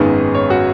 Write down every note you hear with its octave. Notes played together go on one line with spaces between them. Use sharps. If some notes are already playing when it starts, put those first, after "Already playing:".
Already playing: G#1 F#2 D#3 G#3 B3
C#5
F#4